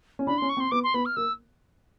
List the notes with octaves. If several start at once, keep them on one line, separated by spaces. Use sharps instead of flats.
C#4
D4 B5
C6
C#4
C#6
C4
C6
B3 D6
C6
B3 B5
F6
A#3 E6